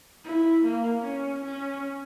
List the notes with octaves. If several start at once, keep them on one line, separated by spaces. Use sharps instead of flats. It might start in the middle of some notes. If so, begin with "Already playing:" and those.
E4
A#3
C#4
C#4